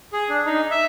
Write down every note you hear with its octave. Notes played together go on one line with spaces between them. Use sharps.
G#4
D4
D#4
E5